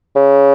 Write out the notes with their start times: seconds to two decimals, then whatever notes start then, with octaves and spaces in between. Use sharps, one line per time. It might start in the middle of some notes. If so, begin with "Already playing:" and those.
0.16 C#3